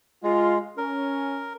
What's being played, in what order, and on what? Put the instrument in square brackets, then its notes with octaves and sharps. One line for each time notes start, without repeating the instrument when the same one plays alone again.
[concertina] G#3 [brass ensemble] F4
[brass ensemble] C#4 [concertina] A#4